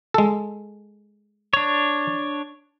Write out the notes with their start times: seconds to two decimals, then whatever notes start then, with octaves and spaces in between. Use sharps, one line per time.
0.14 G#3 A4
1.53 D4 C#5